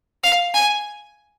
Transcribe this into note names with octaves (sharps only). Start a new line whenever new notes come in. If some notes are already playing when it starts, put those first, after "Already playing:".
F5
G#5